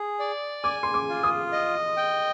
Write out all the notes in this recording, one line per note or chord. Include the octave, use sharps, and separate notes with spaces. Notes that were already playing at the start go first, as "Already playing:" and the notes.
Already playing: G#4
D5
G#5 D6
C6
D6
F4
D#6
D#5
G5